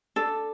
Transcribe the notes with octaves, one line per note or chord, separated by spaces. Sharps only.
D4 A4